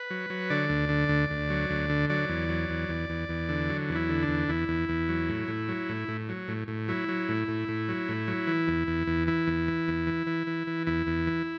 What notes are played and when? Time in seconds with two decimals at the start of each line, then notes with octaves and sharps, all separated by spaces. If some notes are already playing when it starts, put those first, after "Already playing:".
Already playing: B4
0.10 F#3
0.30 F#3
0.50 D3 D5
0.69 D2
0.89 D3
1.09 D2
1.30 D2
1.50 F#3
1.70 D2
1.89 D3
2.10 F#3 D5
2.29 E2
2.49 F#3
2.70 E2
2.89 E2
3.10 E2
3.29 E2
3.49 D3
3.69 F#3
3.89 E2 D4
3.95 E4
4.09 D3
4.23 D4
4.28 E2
4.48 E2 E4
4.69 E2
4.89 E2
5.09 F#3
5.29 A2
5.48 A2
5.68 F#3
5.89 A2
6.08 A2
6.29 F#3
6.48 A2
6.68 A2
6.88 F#3 E4
7.08 F#3
7.29 A2
7.48 A2
7.68 A2
7.89 F#3
8.09 A2
8.28 F#3
8.47 E3
8.68 E2
8.88 E2
9.07 E2
9.27 E3 E4
9.47 E2
9.68 E3
9.88 E2
10.07 E3
10.27 E3
10.47 E3
10.67 E3
10.87 E2 E4
11.07 E2
11.27 E3